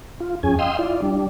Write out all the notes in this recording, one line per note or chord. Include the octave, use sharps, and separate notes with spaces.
F4
F2 C#4 G#4 G#5
D#5 F5 G5 C6 D#6 E6
E4 F4 D5
G3 D4